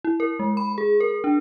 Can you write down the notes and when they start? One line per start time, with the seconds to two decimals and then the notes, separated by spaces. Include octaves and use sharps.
0.05 E4
0.20 A#4
0.39 G#3
0.57 B5
0.78 G#4
1.00 A#4
1.24 D4